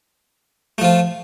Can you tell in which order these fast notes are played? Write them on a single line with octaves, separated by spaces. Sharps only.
A3 F3 F4